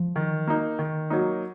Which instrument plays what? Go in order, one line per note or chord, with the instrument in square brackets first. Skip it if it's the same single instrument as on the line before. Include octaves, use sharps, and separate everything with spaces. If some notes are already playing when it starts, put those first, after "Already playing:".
Already playing: [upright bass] F3
[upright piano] D#3
A#3 D#4
D#3
F#3 A#3 D#4